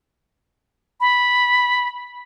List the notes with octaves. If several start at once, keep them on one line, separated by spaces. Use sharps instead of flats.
B5